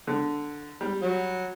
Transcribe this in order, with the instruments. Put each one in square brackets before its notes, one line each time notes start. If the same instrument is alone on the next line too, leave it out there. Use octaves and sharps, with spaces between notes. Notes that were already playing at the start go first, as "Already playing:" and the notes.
[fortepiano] D3
G3
[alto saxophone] F#3